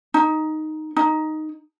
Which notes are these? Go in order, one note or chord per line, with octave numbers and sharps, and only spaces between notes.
D#4
D#4